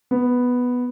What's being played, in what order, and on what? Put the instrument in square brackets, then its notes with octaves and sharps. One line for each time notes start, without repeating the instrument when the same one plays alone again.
[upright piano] B3